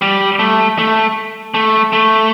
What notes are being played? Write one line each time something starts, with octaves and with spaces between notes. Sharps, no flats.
G3
A3
A3
A3
A3